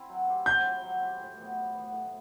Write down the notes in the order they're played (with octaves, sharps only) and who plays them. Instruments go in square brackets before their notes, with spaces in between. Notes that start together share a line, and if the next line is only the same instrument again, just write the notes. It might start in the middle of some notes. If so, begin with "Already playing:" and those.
Already playing: [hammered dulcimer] C4 E4
F#3
C4 E4 G4
[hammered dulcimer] F#3 [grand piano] G6
[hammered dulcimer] C4 E4 G4
F#3
C4 E4 G4
A2
E3 B3
A2
E3 B3
A2